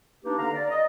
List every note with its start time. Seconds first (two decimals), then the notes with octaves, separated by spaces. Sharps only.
0.24 A#3 D4 D#4 G4 B4
0.39 D3 F5 A#5
0.54 D5
0.69 D#5